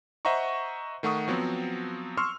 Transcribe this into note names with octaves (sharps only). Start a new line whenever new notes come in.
C5 D#5 E5 F#5 A#5 C#6
D#3 A3 F#5 C#6 D#6
F3 F#3 B3 C4
C6 C#6 E6 F6